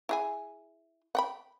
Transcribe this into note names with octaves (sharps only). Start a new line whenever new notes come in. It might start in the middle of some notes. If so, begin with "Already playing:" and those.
E4 G#4 G#5
F#5 G5 B5